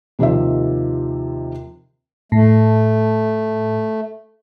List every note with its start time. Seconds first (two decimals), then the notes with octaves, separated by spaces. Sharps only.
0.19 D#2 C3 D#3 F3 E5
2.32 A2 A3